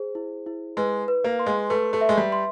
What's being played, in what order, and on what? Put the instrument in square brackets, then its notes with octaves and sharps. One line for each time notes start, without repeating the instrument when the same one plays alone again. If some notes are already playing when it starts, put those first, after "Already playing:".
Already playing: [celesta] G#4 C5
E4
E4
[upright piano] G#3 [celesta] B4
[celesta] B4
[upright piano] A#3
[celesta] C6
[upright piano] G#3
[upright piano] A3 [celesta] B4
[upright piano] A3
[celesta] E5
[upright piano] G#3
G3
[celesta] C6